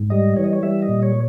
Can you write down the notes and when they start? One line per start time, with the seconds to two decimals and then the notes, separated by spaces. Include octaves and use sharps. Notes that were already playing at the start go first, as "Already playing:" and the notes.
Already playing: G#2
0.10 G3 D#5
0.36 E3 C#5
0.44 D#5
0.53 C#5
0.63 G3 E5
0.82 D#5
0.89 A#2
1.03 C#5